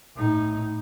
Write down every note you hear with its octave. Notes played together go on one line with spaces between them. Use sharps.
A2 D#4